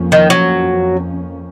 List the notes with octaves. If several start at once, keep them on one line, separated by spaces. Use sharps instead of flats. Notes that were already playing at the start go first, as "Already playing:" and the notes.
Already playing: F2 F3 A#3 C#4
D#3
F#3